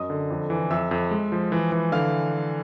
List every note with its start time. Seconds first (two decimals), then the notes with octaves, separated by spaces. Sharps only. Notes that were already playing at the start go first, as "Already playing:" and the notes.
Already playing: F#2 D#5 D#6
0.10 D3
0.30 F2
0.50 E3
0.70 F2 E5 E6
0.91 F2
1.11 G#3
1.32 F3
1.52 E3
1.72 E3
1.92 D3 F5 F6